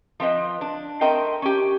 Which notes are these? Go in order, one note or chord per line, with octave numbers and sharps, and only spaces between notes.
F3 C4 B4 D#5
D4
A3 C4 A#4 D#5 G5
C#4 G4